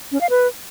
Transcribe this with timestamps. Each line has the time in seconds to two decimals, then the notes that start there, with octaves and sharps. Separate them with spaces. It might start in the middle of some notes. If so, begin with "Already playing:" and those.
0.12 C#4
0.21 F5
0.30 B4